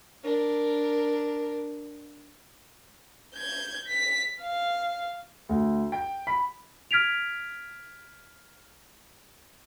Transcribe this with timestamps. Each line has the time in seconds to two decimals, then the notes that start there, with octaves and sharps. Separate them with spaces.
0.23 D4 A#4
3.35 G6 G#6
3.87 B6
4.42 F5
5.49 D2
5.92 G5
6.27 B5
6.91 F6 G#6 B6 D7 F7